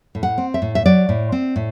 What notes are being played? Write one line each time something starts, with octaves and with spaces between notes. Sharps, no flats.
A2
F#5
C4
E5
A2
E5
F#3 D5
A2
C4
A2